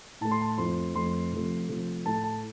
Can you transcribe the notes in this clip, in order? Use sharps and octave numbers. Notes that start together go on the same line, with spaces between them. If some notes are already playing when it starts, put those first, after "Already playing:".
A2 A3 A5
C6
A5
F2 F3 A3 C6
F2 F3 A3 C6
C3 F3 A3
C3 F3 A3
A2 A3 A5
A5